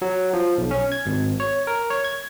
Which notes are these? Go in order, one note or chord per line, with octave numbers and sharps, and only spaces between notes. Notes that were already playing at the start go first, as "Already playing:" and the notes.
F#3
F3
B1
C#4
G#6
G#1
C#5
A#4
C#5
G#6